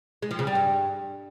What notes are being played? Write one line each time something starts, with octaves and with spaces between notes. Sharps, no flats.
G#3
F3
C#3
G3
G2